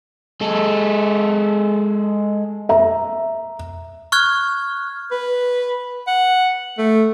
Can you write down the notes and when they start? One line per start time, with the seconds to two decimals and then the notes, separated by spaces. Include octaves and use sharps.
0.41 G#3 A4
2.69 E5 A#5
4.12 C#6 F6 F#6 G#6
5.11 B4
6.07 F#5
6.78 A3